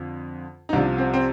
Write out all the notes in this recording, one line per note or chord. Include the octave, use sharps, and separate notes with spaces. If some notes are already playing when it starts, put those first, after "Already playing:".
Already playing: F2 D3
D#4
C2 C3 F3 D4
C4
C4